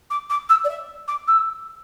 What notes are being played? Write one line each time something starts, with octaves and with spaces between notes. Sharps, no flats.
D6
D6
E6
D5
E5
D6
E6